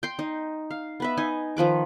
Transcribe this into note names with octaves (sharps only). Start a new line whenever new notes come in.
G5 C6
D#4
F5
B3 B4 E5
D#4 G#5
D#3 F3 B4 D6